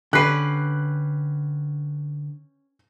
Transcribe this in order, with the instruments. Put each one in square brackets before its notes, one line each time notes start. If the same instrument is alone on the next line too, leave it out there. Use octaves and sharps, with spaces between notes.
[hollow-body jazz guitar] D3 [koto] C#4 G4 B4 [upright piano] F#6 C7